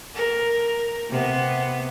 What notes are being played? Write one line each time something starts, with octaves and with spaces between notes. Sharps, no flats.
A#4
C3 B3